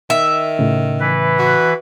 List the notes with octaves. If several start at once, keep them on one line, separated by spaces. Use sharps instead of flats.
D#3 E5
A2 C#3
E3 B4
F#4